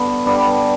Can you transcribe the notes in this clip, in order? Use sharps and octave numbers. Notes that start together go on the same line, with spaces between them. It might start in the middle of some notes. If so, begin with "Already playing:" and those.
Already playing: G2 D3 B3
G2 D3 G3 B3